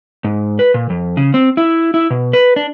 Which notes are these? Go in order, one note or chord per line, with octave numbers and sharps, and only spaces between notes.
G#2
B4
A#2
F2
C#3
C4
E4
E4
B2
B4
D4